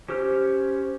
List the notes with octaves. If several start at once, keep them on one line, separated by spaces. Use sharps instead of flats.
C#4 G4 C5 F6